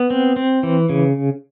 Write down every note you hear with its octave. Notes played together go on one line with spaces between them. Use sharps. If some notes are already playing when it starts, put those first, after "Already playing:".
Already playing: B3
C4
C4
E3
C#3